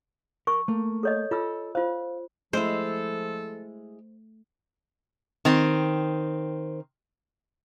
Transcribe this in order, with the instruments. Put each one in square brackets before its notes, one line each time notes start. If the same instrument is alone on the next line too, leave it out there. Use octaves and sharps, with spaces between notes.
[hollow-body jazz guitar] A#4 [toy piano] C#6
[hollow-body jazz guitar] A3 A#3
[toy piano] A4 C#5 D#5
[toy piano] F4 E6 [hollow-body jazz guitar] A4
[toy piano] F4 C5 [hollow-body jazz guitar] F5
[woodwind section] F3 A4 [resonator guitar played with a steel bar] G#3 E4 [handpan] A3 [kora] C5
[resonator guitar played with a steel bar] D#3 C4